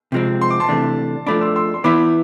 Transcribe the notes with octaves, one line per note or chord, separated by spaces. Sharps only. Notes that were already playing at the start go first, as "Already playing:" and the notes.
C3 F3 G#3 C4
C6
D6
A5 C6
C3 E3 A3 D4
F3 A3 D4 B5 D6
C6 E6
C6 E6
C6
E3 B3 E4 B5 D6